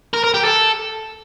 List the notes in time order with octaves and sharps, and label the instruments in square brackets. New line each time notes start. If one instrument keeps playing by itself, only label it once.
[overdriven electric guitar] A#4
A#4
G4
A4